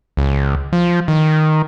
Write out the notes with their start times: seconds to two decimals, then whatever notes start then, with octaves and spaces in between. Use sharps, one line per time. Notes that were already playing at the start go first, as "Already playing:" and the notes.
0.17 C#2
0.73 F3
1.08 D#3